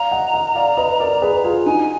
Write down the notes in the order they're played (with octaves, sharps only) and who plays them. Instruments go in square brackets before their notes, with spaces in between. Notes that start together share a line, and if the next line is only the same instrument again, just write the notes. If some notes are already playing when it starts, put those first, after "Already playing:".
Already playing: [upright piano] D5 F5 [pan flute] A#5
[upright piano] D#5 F#5
D#5 F#5
D5 F5
B4 D#5
A#4 D5
D5
G#4 B4
F4 G#4
[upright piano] D#4 F#4 [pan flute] G#5